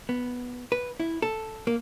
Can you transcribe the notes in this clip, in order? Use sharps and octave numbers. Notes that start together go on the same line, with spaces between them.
B3
B4
E4
A4
A#3